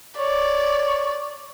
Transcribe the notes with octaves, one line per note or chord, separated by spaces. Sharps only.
C#5 D5